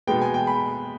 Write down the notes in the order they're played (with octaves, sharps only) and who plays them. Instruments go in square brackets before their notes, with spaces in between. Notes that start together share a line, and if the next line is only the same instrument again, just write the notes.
[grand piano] B2 G#3 B3 G5
G#5
G5
B5